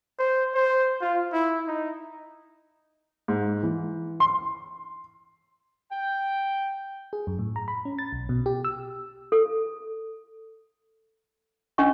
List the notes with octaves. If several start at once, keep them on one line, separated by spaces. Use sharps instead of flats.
C5
C5
F4
E4
D#4
G#2
E3
C6
G5
G#4
F#2
A2
A#5
B5
C#4
A6
B1
B2
G4
E6
A4
C#4 D4 D#5 C#6